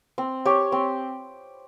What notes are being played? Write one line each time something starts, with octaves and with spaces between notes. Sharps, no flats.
C4
G4 C#5
C4